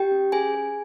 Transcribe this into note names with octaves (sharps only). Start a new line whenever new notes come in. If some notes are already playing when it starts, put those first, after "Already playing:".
Already playing: G4 G5
C#4
C#4 G#4 G#5
G#4